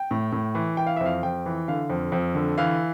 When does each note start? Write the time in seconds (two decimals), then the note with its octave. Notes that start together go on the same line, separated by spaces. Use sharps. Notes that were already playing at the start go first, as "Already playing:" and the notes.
Already playing: G5
0.11 A2
0.32 A2
0.55 E3
0.77 E3 G5
0.87 F5
0.96 F2 E5
1.06 F5
1.23 F2 G5
1.46 E3
1.68 D3 F5
1.90 F2
2.12 F2
2.35 D3
2.58 E3 F5